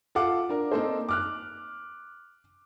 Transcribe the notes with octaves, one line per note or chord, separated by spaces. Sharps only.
F4 A4 F5 F#5 D6
D4 A#4
A#3 C4 D#4 A4 C5
D6 F6 F#6